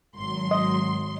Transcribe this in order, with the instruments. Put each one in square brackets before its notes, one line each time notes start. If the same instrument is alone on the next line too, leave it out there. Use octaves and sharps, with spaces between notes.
[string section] G#1 F#3 C6
[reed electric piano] D#5